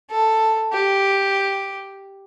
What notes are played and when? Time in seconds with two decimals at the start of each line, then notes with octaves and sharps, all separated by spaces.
0.10 A4
0.73 G4